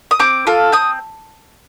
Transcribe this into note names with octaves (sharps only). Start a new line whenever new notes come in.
D#6
C4 D6
F4 A4
C4 D#6